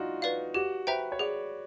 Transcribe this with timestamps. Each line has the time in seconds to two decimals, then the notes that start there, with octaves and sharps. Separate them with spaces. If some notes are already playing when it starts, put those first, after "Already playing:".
Already playing: D4 D#4 F4 F#4
0.22 B4 D5 F5
0.54 F#4 G4
0.87 B4 C5 E5 G5 A#5
1.12 C#5
1.19 G#4 D5